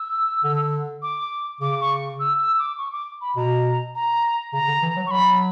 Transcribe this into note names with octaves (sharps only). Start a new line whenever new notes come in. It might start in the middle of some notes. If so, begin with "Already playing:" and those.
Already playing: E6
D3
D6
C#3 D6
C#6
E6
E6
D6
C#6
D6
B5
B2 A#5
A#5
C#3 A#5
D3
E3
F#3
C#6
F#3 B5